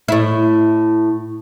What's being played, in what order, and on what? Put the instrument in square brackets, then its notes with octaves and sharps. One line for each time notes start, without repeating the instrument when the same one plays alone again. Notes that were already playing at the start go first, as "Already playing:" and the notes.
[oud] A2 E4